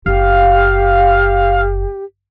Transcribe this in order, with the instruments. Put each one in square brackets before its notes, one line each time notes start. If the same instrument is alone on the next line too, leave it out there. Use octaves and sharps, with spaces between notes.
[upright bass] F#1 [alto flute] G4 [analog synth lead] F5